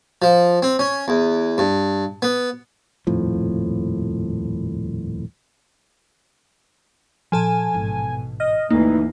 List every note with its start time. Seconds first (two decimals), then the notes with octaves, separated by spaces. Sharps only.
0.22 F3
0.63 C4
0.79 C#4
1.08 E2
1.58 G2
2.22 B3
3.07 D#1 F2 A2 F3
7.32 A#2 F3 C#4 A4 G#5 A5
7.73 A1 G#2 B2
8.40 D#5 F6
8.70 G1 D2 E3 A3 A#3 D#4